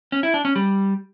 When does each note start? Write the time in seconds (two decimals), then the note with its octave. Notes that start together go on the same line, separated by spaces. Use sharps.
0.12 C#4
0.23 E4
0.34 D4
0.45 C#4
0.56 G3